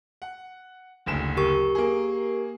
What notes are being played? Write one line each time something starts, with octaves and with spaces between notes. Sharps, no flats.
F#5
F#1 D2 E7
G4 A#4 C#6
A#3 G#4